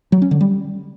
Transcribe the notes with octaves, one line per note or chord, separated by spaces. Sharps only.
F#3
C#4
D3
G3